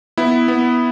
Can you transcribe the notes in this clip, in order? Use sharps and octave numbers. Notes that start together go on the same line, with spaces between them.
B3 E4
B3